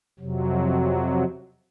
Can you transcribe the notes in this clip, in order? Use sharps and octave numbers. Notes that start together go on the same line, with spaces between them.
F2 C3 F#3